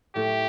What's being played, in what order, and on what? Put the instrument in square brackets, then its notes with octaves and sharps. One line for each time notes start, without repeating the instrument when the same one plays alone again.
[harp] A2 A3 E4 [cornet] G4